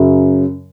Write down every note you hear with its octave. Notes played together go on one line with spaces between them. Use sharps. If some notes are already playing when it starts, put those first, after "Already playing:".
Already playing: F#2 C#3 F#3